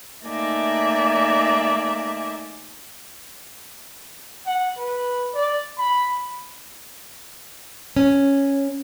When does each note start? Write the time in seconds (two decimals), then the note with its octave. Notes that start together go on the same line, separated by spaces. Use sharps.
0.25 A3 A#3 D#4 D5 E5 G#5
4.47 F#5
4.78 B4
5.34 D5
5.78 B5
7.96 C#4